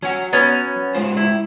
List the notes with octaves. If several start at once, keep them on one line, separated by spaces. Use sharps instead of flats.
F#3 C#4 F#5
B3 C#4
G#3 F4 C5
E4